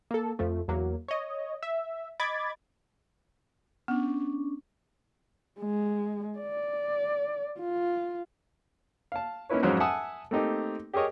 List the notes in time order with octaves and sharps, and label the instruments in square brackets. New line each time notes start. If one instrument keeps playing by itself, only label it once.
[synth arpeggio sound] A#3 A4
F2 F3 A3
E2 F#3 A#3
C#5 D#5
E5
D#5 B5 D6 G#6 A6
[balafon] B3 [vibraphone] C#4 D4
[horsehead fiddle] G#3
D5
F4
[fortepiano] F5 A5
A#3 C#4 D#4 E4 B4 C#5
F2 G#2 F#3 C#4 C5
E5 F#5 G#5 A5 D#6 E6
A3 A#3 C4 D#4 G4
G4 G#4 A#4 C#5 D#5